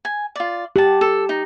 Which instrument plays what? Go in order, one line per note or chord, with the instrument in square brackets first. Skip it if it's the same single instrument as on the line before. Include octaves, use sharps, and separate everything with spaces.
[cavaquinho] G#5
F4 D5
[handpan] G4 [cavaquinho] F#5 A5
[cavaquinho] A4
D#4